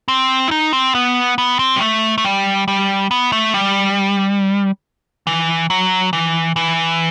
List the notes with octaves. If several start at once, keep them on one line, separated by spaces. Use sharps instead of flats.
C4
E4
D#4
C4
B3
B3
C4
G3
A3
A3
G3
G3
B3
A3
G3
E3
F#3
E3
E3